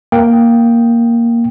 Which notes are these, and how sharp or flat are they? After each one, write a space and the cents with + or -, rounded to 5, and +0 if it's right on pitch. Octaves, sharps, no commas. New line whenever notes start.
A#3 +0 G5 +0